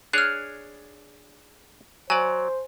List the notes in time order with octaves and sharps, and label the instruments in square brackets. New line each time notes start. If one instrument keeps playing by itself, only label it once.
[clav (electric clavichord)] D4 G#4 C#5 [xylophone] F6 F#6
[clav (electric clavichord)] F#3 D5 [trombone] C5 [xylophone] G#5